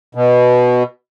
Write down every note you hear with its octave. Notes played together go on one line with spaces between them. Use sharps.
B2